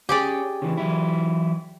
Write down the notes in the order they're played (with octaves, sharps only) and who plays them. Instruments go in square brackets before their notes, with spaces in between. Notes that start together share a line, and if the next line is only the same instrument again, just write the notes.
[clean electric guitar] C#4 [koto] G4 G#4 D5
[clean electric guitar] C#3 E3
E3 F#3 E4